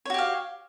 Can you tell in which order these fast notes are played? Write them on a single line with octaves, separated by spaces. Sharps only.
C#5 F#4 G4 F5